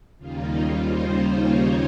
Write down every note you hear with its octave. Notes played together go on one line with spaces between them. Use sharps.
D#2 C#3 G3 A#3 D#4 F4
C5
C#5